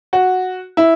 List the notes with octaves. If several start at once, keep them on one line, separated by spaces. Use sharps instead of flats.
F#4
E4